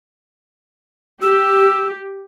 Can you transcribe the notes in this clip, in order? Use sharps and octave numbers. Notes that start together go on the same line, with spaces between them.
G4 E6